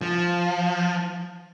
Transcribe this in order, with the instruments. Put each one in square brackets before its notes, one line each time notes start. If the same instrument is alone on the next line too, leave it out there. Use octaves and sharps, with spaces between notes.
[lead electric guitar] F3